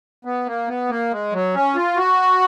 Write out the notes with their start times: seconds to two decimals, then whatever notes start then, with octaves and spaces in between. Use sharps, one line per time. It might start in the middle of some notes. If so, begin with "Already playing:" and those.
0.25 B3
0.46 A#3
0.68 B3
0.90 A#3
1.11 G#3
1.33 F#3
1.54 C#4
1.75 F4
1.97 F#4